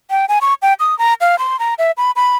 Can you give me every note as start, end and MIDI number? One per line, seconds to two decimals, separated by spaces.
0.10 0.26 79
0.29 0.39 80
0.41 0.54 85
0.62 0.74 79
0.80 0.97 87
0.99 1.14 82
1.21 1.38 77
1.39 1.59 84
1.59 1.74 82
1.78 1.91 76
1.97 2.11 83
2.16 2.37 83